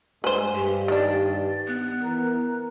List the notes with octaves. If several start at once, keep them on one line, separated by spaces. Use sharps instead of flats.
G2 G#3 B4 C5 G#5
G2 G4
D#3 D4 A6
B3 F#6
E3 A#4